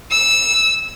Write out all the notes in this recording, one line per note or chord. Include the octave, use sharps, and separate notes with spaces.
E6